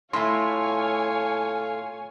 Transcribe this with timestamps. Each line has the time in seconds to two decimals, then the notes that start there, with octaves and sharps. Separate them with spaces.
0.13 A2 A3 F4 C#5 G#5 C6